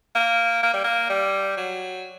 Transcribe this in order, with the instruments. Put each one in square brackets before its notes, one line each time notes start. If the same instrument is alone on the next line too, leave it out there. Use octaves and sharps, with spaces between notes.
[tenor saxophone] A#3
A#3
G3
A#3
G3
F#3